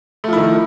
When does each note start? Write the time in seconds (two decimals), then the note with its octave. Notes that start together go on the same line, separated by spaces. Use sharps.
0.24 A3
0.28 F3
0.33 E4
0.37 D#3